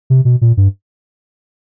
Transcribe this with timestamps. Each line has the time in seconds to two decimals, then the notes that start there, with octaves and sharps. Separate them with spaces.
0.10 C3
0.25 B2
0.41 A#2
0.57 G2